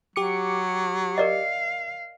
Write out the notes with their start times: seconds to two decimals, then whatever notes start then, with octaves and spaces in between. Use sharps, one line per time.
0.16 F#3 G4 D6 C#7
1.18 A#4 D5 D#5 F5